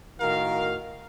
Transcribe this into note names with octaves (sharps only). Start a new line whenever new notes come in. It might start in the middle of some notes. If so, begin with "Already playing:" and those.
A2 D#3 F#4 A#4 F5